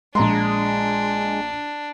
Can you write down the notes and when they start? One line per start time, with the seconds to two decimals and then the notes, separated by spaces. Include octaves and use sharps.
0.15 A#1 G#3 D4 A#5 C6